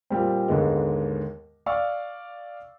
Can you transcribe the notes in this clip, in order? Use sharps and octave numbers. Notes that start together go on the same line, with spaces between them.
A#2 G3 C4
D#2 G#2 D3 G#3 B3
D5 F5 C#6 E6